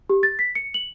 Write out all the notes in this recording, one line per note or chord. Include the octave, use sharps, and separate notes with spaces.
G4
A6
B6
C#7
F#7